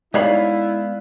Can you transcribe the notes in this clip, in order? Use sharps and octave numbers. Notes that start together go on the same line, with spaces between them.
G#3 B3 D#4 E4 C#5 D5 F5 B5